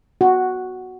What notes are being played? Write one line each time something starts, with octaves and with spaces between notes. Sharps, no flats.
F#4